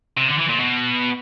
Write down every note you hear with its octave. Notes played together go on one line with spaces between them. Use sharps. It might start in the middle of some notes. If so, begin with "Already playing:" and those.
C3
D3
E3
A#2
B2